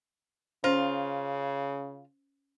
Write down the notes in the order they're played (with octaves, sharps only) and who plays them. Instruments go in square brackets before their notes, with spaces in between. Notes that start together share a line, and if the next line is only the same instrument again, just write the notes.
[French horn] C#3 [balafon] C#4 C5 [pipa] F4